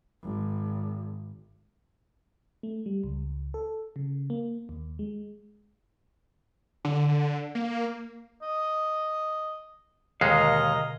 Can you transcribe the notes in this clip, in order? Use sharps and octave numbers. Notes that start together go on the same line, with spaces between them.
G#1
A3
G3
C#2
A4
C#3
A#3
D#2
G#3
D3
D3
A#3
D#5
D#2 B2 D3 G#3 A#4 D#5 F5